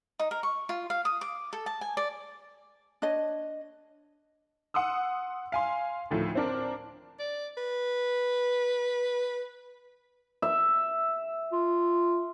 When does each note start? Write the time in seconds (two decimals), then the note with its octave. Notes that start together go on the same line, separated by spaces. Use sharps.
0.20 D#4
0.31 A#4
0.43 C#6
0.69 F4
0.90 F5
1.05 D#6
1.21 D6
1.53 A4
1.66 A5
1.81 G#5
1.97 D5
3.02 D4 C#5 D#5
4.74 F#5 C6 D#6 E6
5.52 F5 G#5 C6
6.11 D2 A2 D#3 F3
6.35 C4 D4 A#4
7.19 D5
7.57 B4
10.42 E5
11.52 F4